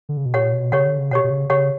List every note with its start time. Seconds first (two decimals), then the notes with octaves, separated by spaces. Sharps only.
0.09 D3
0.17 C#3
0.26 B2
0.34 A#2 G4 C#5 F#5
0.53 B2
0.72 C#3 G4 C#5 F#5
0.85 D3
0.98 C#3
1.11 B2 G4 C#5 F#5
1.24 B2
1.30 C#3
1.50 C#3 G4 C#5 F#5